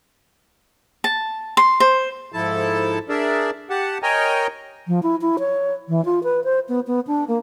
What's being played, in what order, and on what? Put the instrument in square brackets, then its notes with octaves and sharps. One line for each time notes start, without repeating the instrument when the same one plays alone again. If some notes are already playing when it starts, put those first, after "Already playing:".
[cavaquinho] A5
C6
C5
[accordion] G#2 F3 E4 A4 A5
D4 G#4 A#4 D5 E5
G4 F#5 A5
A#4 C#5 D#5 G5 G#5 A#5
[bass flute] F3
E4
E4
C#5
E3
F4
B4
C5
B3
B3
D4
A#3